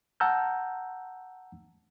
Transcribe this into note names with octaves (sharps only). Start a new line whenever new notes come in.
F#5 A5 A#5 E6 F6 G6